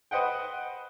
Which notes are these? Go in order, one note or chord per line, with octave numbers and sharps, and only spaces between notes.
B4 C5 D#5 F#5 G5